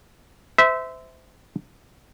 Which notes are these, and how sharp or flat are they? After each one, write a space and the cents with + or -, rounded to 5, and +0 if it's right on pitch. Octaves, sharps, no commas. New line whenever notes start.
C5 -30 E5 -15